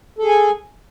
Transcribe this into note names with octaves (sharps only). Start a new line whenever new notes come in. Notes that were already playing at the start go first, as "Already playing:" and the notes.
G#4 A4 G#5